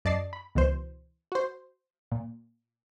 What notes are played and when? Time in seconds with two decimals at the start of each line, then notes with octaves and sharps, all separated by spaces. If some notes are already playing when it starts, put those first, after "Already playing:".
0.05 F#2 D5 D#5 A5 A6 C7
0.33 B5
0.55 C#2 B2 E3 C5
1.32 F#4 C5
2.12 A#2